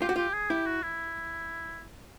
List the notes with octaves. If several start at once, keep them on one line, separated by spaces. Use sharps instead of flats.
F4 G4
F#4
F4 G4
G#4
E4 G4
F#4
E4